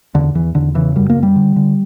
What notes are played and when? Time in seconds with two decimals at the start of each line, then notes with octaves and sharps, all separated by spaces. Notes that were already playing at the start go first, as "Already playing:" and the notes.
0.15 E2 D3
0.35 E2 E3
0.55 E2 D3
0.75 C#3 E3
0.96 F#2 G3
1.10 A#3
1.16 F#2
1.23 G3
1.36 D3
1.56 D3